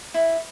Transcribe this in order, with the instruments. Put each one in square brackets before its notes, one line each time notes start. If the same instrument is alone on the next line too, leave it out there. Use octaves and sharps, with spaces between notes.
[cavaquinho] E4